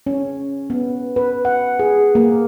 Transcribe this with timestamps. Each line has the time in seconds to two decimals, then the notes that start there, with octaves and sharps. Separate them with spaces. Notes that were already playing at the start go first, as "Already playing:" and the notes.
0.07 C#4
0.70 B3
1.16 B4
1.45 F#5
1.79 G#4
2.15 A#3